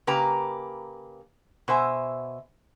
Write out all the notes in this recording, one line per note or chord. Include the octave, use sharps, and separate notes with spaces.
C#3 A#3 G4 B4 A#5
B2 C5 E5 G#5